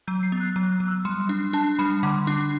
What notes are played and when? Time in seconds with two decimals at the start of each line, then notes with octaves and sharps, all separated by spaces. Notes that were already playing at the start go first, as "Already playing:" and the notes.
0.07 F#3 G6
0.23 C7
0.32 B3
0.40 F#6
0.56 F#3 F#6
0.73 F#6
0.80 F#3
0.88 E6
1.05 G3 C6
1.29 D4
1.53 D4 A5
1.79 G3 B5
2.03 D3 D6
2.27 D4